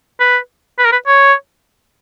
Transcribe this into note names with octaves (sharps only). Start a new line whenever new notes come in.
B4
B4
A#4
B4
C#5